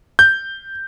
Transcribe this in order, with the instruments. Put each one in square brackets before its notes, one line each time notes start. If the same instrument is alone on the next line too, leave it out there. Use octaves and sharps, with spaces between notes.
[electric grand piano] G6